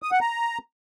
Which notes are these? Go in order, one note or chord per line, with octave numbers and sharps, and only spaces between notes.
D#6
F#5
A#5